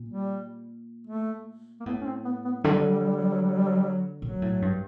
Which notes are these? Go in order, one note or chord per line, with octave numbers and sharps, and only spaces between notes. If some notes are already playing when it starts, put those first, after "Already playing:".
Already playing: A#2
G3
A3
A#3
A2 B3
C#4
C4
B3
B3
D3 F#3
G3
F#3
G3
F#3
G3
F#3
G3
F#3
G3
F#3
G3
F#3
G3
F#3
A#2 F#3
A2
G2